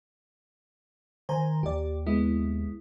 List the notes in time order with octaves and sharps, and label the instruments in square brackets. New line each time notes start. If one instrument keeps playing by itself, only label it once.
[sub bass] D#3 [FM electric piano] C5 G#5 A#5
[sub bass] D#2 [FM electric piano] G4 D5
[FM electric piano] G#3 B3 E4